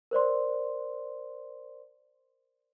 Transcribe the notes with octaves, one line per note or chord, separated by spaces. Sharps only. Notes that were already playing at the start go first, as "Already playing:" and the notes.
A#4 C5 D5 C6